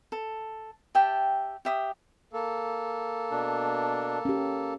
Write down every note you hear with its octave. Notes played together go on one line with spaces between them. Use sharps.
A4
G4 E5 G5 A5
G4 E5 D#6
A#3 A4
B2 D4
C#4 G4